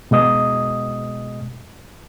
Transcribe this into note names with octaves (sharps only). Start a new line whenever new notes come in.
B2 G#3 D#5 D#6